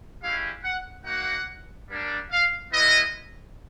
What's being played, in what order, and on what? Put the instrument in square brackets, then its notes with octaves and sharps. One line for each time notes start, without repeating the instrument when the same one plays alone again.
[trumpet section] G#3 C#4 E4 G4 F5
F#5
A#3 D#4 F#4 F#5
G3 A#3 D4
F5
G#3 B3 E4 D#5